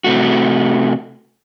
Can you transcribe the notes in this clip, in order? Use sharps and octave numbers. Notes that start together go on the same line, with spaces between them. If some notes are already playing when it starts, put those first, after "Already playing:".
C3 A3 F#4